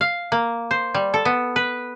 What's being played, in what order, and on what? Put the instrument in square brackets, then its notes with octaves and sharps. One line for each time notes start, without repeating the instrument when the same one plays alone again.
[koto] F5
A#3
C5
G3
A4
B3
B4